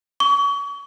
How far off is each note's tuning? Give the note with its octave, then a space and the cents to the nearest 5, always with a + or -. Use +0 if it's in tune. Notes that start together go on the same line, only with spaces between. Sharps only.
C#6 +35